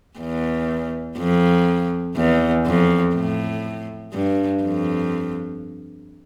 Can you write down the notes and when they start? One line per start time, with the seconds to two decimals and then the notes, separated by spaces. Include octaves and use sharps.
0.19 E2
1.18 F2
2.16 E2
2.66 F2
3.15 A2
4.13 G2
4.63 F2